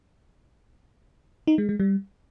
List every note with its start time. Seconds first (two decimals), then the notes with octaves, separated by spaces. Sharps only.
1.47 D#4
1.58 G#3
1.69 G#3
1.80 G3